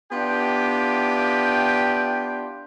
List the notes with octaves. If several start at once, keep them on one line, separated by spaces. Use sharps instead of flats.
B3 D4 E4 F4 G4 G5